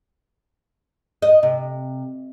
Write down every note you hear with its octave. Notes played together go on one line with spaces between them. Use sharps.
D#5
C3